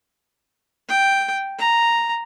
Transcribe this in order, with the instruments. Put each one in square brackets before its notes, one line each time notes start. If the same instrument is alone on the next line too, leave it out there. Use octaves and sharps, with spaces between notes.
[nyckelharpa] G5
A#5